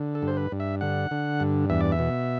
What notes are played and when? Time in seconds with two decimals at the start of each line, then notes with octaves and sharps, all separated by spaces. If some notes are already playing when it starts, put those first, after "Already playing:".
Already playing: D3
0.15 A4
0.22 G2
0.28 C5
0.37 B4
0.52 G2
0.60 E5
0.81 D3 F#5
1.11 D3
1.40 G2
1.70 E2 E5
1.80 D5
1.92 E5
1.99 B2